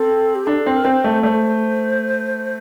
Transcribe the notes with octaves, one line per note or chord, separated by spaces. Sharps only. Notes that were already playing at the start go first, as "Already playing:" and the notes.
Already playing: C4 A4
G4
D4 A4
C4
A#4
C4 C5
A3
A3 C5 D5